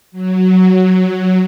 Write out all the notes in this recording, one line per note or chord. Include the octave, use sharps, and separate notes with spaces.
F#3